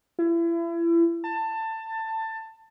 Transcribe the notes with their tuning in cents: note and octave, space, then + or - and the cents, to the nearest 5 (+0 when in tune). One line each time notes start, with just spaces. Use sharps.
E4 +35
A5 +20